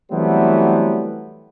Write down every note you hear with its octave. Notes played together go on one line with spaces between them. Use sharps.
E3 F#3 G3 A3 B3 C4